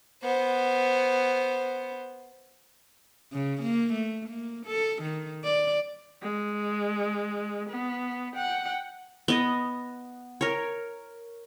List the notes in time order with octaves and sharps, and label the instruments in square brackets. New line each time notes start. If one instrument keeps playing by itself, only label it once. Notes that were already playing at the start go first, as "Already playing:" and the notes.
[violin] B3 C5
[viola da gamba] C#3
A#3
A3
A#3
A4
D#3
D5
[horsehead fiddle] G#3
B3
F#5 G5
[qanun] B3 D#5
A#4 C#5